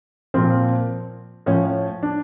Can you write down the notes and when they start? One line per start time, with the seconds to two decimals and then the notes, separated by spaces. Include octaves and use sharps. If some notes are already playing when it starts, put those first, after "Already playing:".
0.34 A#2 F3 C4
1.46 A2 F3 C#4
2.03 D4